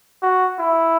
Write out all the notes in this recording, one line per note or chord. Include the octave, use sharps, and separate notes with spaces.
F#4
E4